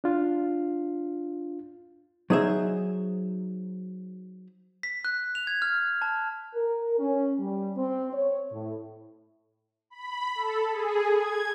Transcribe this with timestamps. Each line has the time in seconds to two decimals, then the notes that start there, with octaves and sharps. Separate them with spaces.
0.04 D4 F4
2.30 F#3 D#4 G#4 C5 E5
4.83 B6
5.05 F#6
5.35 F7
5.47 G#6
5.62 F6
6.02 A5
6.55 A#4
6.99 C#4
7.40 G3
7.77 C4
8.13 C#5
8.52 A2
9.90 B5
10.35 A4
10.71 G#4
11.14 G#6